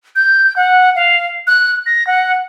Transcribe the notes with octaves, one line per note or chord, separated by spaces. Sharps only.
G6
F#5
F5
F#6
A#6
F#5